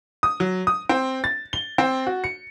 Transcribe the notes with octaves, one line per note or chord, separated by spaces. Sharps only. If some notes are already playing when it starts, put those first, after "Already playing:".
D#6
F#3
D#6
C4
A6
G7
C4
F#4
C#7